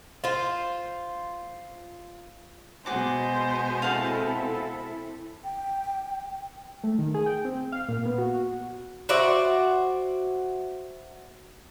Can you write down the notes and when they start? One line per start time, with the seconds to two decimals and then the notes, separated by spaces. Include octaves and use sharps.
0.24 F4 C5
2.86 B2 G#3 F#4 C5 D6
3.82 C4 E4 A4 F5 F#5 A5
5.44 G5
6.84 A3
6.99 D#3
7.14 G#4
7.26 G5
7.45 C4
7.72 F5
7.88 A#2
8.06 B3
8.18 F#4
9.09 F#4 C5 D5 E5